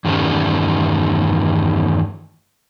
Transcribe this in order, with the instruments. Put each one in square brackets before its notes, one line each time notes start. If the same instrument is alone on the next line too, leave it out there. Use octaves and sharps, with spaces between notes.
[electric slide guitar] E2 G2 D#3 G3 A3 C#4